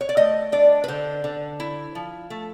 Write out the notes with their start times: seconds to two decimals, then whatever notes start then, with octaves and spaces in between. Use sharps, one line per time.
0.01 C#5
0.09 D5
0.17 A3 D#5
0.52 D4 D5
0.84 B4
0.88 D3 C5
1.24 D3
1.60 E4
1.95 F3
2.30 A3